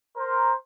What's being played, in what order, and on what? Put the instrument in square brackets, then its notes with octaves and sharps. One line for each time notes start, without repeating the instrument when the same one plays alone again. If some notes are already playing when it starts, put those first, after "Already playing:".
[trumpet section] A#4 C5